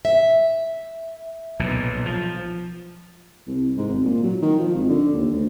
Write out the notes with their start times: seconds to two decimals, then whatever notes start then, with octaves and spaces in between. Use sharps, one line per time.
0.05 E5
1.60 B1 A#2
2.06 F3
3.47 C2
3.77 G#2
3.89 G#1
4.05 A#2
4.23 F#3
4.42 D#3
4.59 F3
4.74 G#1
4.89 D3
5.14 D#2
5.33 D2